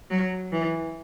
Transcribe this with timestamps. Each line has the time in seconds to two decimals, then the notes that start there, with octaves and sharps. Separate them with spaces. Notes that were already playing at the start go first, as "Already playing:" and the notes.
0.10 F#3
0.52 E3